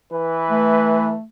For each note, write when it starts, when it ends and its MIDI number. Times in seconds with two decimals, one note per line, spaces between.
0.12 1.14 52
0.12 1.13 71
0.50 1.25 57